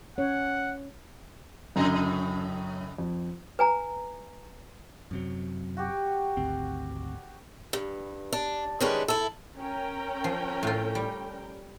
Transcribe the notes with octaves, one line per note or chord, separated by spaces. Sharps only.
C#4 C#5 F#5
F#2 A2 C#3 D#5 A#5
F2
B4 G#5 A#5
F#2 C3 F#3
F#4 G4
G#1 D2 C4
G2
D4
D#3 G3 G#3 C#4 D4 B4
E4 A4
C#4 A#4 G5
F3
A2 F4
G3